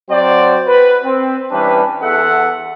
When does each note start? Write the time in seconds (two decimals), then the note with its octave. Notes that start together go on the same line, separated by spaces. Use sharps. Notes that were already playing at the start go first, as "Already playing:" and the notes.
0.10 F#3 C4 F#4 C5 D5
0.67 B4
1.04 C4
1.51 E3 G3 C#4 D4 B4
2.02 E2 A4 E5 F#5